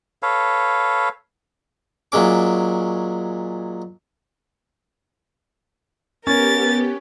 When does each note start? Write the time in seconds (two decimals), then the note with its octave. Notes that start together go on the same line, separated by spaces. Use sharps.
0.23 A4 B4 C#5 F5
2.12 A#2 F#3 G#3 C#4 D6
6.27 B3 C#4 G4 A#4 A6